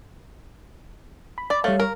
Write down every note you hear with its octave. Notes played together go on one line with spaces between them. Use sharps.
B5
D5
G3 A3 C#5 F5
A#4